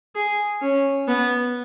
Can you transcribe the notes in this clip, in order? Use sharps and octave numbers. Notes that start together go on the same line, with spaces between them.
G#4
C#4
B3